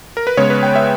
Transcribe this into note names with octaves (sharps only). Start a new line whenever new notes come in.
A#4
B4
C#3 G#3 B3 C#5
B4
G5
E5